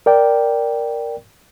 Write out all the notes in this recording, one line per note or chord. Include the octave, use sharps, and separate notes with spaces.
A#4 D5 G5